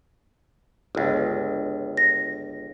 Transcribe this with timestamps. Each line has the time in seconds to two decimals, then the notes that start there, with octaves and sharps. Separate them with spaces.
0.95 G1 C#2
1.97 A#6